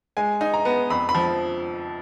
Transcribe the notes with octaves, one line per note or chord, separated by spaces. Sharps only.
G#3 G#5
D#4
A#5
B3
F2 B5
B5
F3